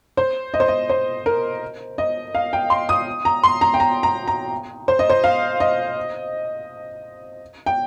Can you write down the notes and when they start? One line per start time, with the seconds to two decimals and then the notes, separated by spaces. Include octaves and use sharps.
0.17 C5
0.54 D#5
0.60 C5
0.68 D#5
0.90 C5
1.26 A#4
1.98 D#5
2.35 F5
2.53 G5
2.70 C6
2.89 D#6
3.25 A#5
3.44 C6
3.61 A#5
3.74 G5
3.80 A#5
4.03 A#5
4.28 A#5
4.88 C5
4.99 D#5
5.10 C5
5.24 F5
5.60 D#5
7.66 G5